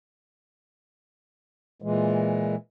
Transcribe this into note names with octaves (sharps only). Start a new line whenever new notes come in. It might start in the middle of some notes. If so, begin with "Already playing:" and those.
A#2 E3 G#3